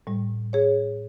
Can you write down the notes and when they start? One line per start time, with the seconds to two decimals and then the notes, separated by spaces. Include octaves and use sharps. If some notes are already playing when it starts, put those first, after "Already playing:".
0.07 A2 G3
0.53 G#4 C#5